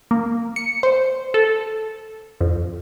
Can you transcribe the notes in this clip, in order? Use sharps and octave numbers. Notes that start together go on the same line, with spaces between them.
A#3
C#7
C5
A4
F2